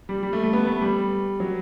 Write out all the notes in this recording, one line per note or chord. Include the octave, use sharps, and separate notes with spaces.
G3
G3
A3
A3
B3
A3
G3
F#3